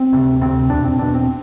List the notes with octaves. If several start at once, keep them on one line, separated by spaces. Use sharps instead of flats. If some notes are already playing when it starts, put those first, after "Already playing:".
Already playing: C4
D2 C3
D2 C3 C4
E2 B2 D4
C4
E2 B2 D4
C4